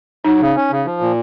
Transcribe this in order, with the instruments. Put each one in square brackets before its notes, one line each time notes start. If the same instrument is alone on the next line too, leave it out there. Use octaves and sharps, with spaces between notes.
[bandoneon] F#3 [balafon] D#4
[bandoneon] C#3
C#4
C#3
F3
A#2